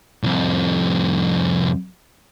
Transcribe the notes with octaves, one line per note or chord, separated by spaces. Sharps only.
C2 F2